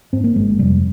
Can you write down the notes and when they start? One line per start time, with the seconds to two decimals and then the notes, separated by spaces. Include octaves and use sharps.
0.13 G#2 C4
0.24 A#3
0.36 G1 G#3
0.59 F2 C3 G3